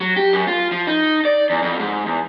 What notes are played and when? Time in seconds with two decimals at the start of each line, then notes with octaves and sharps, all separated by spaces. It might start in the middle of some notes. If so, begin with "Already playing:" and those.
0.01 F#3
0.16 G4
0.33 F#2
0.48 F4
0.71 F3
0.87 D#4
1.25 D5
1.50 E2
1.62 F2
1.79 G#2
2.06 E2